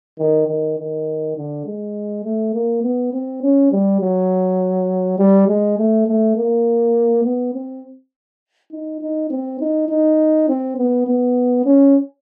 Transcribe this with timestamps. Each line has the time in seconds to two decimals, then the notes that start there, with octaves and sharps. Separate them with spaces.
0.19 D#3
0.48 D#3
0.78 D#3
1.37 D3
1.66 G#3
2.24 A3
2.54 A#3
2.83 B3
3.13 C4
3.42 C#4
3.72 G3
4.01 F#3
5.19 G3
5.48 G#3
5.78 A3
6.07 A3
6.36 A#3
7.24 B3
7.54 C4
8.72 D#4
9.01 D#4
9.30 C4
9.60 D#4
9.89 D#4
10.48 C4
10.77 B3
11.07 B3
11.65 C#4